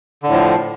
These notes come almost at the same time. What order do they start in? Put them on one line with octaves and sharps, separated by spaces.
D3 A2 F3